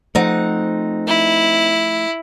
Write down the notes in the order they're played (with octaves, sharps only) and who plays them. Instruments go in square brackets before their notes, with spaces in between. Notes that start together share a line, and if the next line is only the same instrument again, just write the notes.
[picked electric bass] F3 A3 [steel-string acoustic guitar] C4 D#4 F#5
[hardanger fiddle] E4